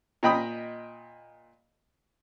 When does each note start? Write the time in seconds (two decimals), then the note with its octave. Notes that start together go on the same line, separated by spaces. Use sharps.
0.23 A#2 D#5 G5 B5 D#6